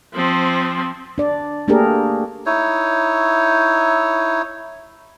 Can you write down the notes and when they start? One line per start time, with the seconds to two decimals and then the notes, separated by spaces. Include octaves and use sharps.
0.14 F3 C4
1.18 D4 D5
1.68 A3 A#3 D4 G4 G#4 A#4
2.46 D#4 E4 C#5